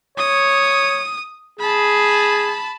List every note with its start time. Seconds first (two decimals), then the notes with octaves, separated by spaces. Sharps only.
0.18 C#5 D#6
1.60 G#4 A5 B5